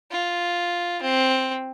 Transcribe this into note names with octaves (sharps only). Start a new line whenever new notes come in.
F4
C4